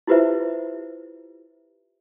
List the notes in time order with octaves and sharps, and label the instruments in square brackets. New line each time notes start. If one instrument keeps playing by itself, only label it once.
[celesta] E4 F4 G4 B4 C5 E5